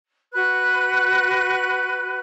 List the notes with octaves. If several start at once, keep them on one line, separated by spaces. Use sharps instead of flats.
F#4 B4 F#6